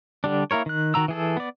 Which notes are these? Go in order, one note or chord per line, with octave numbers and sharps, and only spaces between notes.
D3 G3 D4
A#3 E4 A#4 C#5
D#3 F#6
D#3 F#4 A#5 E6
E3 G#4 A4
B3 D5